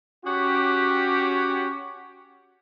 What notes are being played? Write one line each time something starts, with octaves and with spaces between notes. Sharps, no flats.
C#4 F#4 G4